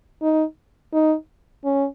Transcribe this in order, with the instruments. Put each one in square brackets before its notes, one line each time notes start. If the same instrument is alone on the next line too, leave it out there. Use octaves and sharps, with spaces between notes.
[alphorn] D#4
D#4
C#4